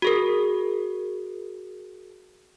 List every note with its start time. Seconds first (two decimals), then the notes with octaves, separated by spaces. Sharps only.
0.02 F#4 G#4 A#4